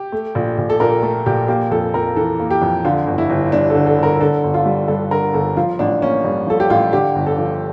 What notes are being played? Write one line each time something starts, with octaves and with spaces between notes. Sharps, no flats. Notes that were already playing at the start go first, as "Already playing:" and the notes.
Already playing: G4
A3
A#1
A#1
A4
A#2 A#4
A3 A4
A#1 G4
A#3 G4
F2 A4
F2 A#4
E3 A4
A#3
G4
F2
D3 F4
G1
E4
G1
G2 D4
A4
D3
A4
G1
A#4
D3 A4
G1
F4
G3
G2 A4
D3 A#4
G1 A4
F3 F4
A1 D4
A#3 C#4
G2 D4
F3 A4
G4
A1 F4
D3 G4
G1
A4
F3